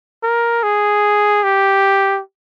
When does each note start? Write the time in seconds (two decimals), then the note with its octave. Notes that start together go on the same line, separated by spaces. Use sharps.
0.23 A#4
0.63 G#4
1.44 G4